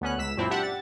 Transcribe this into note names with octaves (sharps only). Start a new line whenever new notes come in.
D2 B3 C#4 F#6
C#2 E6 B6 E7
F#2 A#2 C4 D4 E4
D4 G4 E5 F#5
A6